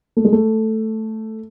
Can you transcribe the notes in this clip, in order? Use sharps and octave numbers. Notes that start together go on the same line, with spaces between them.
A3
G#3
A3